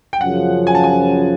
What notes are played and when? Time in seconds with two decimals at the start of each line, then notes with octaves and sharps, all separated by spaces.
0.13 G5
0.20 F#2 C#3 F3 F#5
0.67 G#5
0.75 A5
0.84 G#5